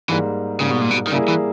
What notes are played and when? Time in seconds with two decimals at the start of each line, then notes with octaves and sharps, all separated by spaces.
0.09 G#2 E3 G3 A#3
0.60 G#2 C#3 G3 A#3
0.71 B2
0.81 A#2
0.91 B2
1.07 D#3
1.12 C#3 G3 A#3 E4 G#4
1.28 E3